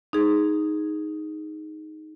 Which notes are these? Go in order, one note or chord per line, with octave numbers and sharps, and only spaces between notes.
D#4 G#4